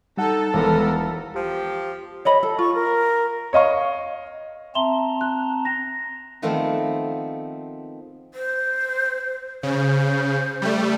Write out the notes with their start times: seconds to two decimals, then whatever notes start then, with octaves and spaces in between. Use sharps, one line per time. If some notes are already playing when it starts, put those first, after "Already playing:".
0.17 G3 D#4 A4 F#5
0.53 E1 B3 A#4
1.36 F3 G4
2.25 C#5 D#5 B5
2.43 A4
2.59 F4 C#6
2.74 A#4
3.53 C#5 D#5 F5 C#6
4.75 C4 E5 A5 A#5 C6 G7
5.21 F#6
5.65 A#6
6.42 D#3 F3 A3 B3 C4
8.34 C5
9.63 C#3 C5
10.62 G3 A3